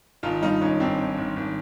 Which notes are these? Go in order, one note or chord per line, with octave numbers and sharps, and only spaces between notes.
G#1 D#4 F4
G2 D#4 F4
G#1 C#4 D#4
G#1 C4 D4
G#1
G#1
G#1